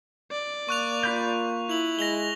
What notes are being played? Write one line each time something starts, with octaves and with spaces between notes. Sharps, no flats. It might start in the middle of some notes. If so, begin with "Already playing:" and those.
D5
A#3 C#6 F#6 F7
F4 B5 F#6 G6
E4 F7 F#7
G#3 A#6 F7 G7